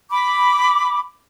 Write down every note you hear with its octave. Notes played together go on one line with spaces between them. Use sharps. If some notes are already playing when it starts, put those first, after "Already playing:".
B5 D6